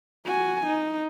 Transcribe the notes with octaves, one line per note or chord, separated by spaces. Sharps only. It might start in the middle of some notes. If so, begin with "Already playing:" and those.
F#4 G#5
D#4